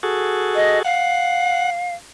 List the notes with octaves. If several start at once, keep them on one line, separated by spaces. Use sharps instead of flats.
F#4 G#4 A4
D#5
F5 F#5